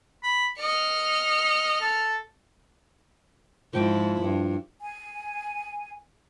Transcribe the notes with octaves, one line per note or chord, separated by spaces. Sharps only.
B5
D#5 F6 C#7
A4
G#2 F3 E4 G5 D6
G2
G#5